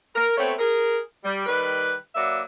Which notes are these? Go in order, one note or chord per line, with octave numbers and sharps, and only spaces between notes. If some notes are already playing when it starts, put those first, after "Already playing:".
A#4
A3 B3 C4 C#5
G#4 A#4
G3
D#3 G3 B4
F#3 A#3 B4 D5 E5